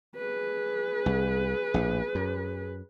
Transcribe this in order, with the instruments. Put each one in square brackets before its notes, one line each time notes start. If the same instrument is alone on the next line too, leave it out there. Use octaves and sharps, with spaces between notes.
[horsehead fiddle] G#4 B4
[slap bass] C2
A#1 A2
F#2